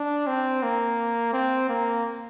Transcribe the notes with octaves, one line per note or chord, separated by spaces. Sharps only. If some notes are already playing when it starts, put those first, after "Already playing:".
Already playing: D4
C4
A#3
C4
A#3